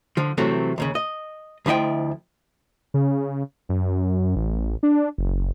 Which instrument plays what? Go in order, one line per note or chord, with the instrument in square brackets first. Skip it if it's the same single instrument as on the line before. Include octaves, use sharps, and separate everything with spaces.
[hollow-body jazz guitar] D3 F3
C3 E3 F#3 A3 C4
D#2 A2 C#3
D#5
D2 F3 E4 D#5 G5
[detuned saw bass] C#3
F#2
A1
D4
F#1